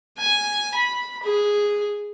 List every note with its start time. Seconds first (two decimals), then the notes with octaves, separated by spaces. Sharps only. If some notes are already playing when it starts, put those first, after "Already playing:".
0.18 G#5
0.75 B5
1.23 G#4